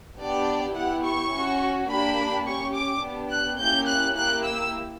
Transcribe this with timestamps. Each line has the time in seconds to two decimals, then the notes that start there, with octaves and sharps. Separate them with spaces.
0.19 B3 D4 G4 D5
0.76 B3 E4 G4 F#5
1.04 C#6
1.33 C#4 F#4
1.89 A#3 D4 G4 B5
2.46 C#4 G4 C#6
2.74 D6
3.02 B3 D4 G4
3.30 F#6
3.59 A#3 C#4 E4 G4 G6
3.87 F#6
4.16 A#3 E4 G4 F#6
4.44 E6